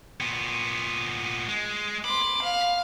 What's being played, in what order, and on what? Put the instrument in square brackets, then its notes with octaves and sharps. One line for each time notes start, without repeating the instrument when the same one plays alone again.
[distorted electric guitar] A#2 B3
G#3
[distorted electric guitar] B5 [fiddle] C6 D6
[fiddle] F5